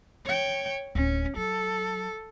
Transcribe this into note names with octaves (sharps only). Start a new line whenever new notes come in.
C#5 G5
D1 D#3 C#4
F#3 A4